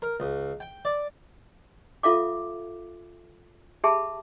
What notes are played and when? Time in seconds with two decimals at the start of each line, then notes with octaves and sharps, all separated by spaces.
0.02 A#4
0.20 C#2
0.60 G5
0.85 D5
2.03 F4 A4 E5 F5 D6
3.84 G4 G#4 E5 A5 B5